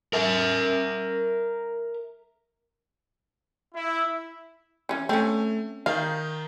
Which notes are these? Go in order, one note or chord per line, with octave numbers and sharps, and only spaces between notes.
A#4 E5
E4
E3 C#4
A3 C4 C#4
D#3 D#4 F5